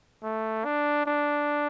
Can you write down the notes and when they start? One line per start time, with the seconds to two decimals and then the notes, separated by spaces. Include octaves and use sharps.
0.23 A3
0.65 D4
1.06 D4